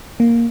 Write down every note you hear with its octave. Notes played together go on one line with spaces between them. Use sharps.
A#3